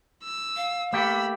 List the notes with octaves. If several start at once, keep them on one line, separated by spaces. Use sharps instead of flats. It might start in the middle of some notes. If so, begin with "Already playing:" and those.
E6
F5
A3 A#3 G4 B5 E6